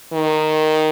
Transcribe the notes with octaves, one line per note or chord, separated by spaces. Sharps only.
D#3